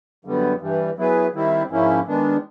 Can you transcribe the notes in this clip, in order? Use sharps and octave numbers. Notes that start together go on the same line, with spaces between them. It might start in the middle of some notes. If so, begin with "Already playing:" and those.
F#2 D3 G3 B3
G2 E3 G3
F#3 B3 E4 G#4 B4
D#3 G3 C4 E4
G#2 F3 A#3 C#4 E4
D#3 G#3 B3 D4